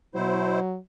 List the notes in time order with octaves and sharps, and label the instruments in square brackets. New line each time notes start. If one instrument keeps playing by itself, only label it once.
[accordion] B2 E4 C5 [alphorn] F#3